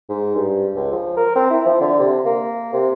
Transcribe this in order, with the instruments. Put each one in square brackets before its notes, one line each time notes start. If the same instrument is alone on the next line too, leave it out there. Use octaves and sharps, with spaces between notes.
[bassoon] G#2
G2
C#2
F3
A#4
C4
E4
F3
D3
C3
A#3
C3